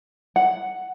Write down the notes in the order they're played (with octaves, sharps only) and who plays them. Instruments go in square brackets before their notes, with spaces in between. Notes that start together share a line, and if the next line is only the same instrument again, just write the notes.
[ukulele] F#5